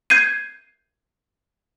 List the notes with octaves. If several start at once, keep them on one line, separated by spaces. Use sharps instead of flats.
G6 G#6 C7 D#7